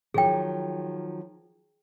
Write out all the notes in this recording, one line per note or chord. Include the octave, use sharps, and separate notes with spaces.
D#3 F3 F#3 G#4 G5